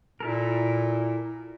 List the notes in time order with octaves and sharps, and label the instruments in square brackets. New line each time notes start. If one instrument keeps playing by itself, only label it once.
[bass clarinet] A#2 [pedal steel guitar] E4 A4 A#4